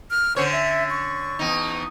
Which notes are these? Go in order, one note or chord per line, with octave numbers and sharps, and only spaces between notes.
F6
D3 C#4 C5 C#5
E5
C#6
E2 D#4